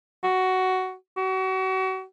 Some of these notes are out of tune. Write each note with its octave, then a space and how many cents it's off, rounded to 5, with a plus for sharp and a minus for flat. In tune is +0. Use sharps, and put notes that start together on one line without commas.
F#4 +10
F#4 +35